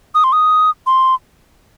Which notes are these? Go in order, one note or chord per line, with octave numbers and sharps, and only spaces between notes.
D#6
C6
D#6
C6